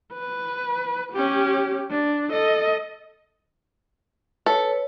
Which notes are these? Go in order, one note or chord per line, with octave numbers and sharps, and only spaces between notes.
B4
C#4 G4
D4
A4 D#5
A4 B4 C#5